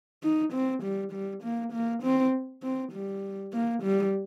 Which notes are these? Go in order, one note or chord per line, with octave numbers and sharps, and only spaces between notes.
D#4
C4
G3
G3
A#3
A#3
C4
C4
G3
A#3
G3